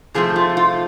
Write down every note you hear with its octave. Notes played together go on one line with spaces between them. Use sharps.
C3 F3 A3 G#4
F4
F4